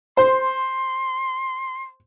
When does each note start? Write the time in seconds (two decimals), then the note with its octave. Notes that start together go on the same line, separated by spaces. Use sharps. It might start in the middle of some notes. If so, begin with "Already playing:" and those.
0.17 C5 C6